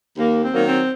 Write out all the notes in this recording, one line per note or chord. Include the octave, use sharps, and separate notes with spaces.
D#2 A#3
C4
D#3 F#3 A#3
C4